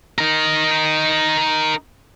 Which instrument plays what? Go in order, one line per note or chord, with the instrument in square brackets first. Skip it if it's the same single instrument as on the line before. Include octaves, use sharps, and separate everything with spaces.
[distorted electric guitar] D#4 A#4